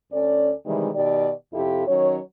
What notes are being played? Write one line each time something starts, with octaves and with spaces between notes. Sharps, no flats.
D2 C#4 A4 D5
C3 D#3 E3 G3 G#3
B2 D#3 G4 D5
F2 C3 E4 F4 G4 A4
D#3 F#3 C#4 C#5